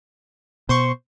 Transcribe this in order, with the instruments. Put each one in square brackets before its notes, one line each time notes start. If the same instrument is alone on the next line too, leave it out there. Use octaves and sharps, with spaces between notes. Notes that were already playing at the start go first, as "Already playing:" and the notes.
[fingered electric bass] B2 [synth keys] C5 C6 C#6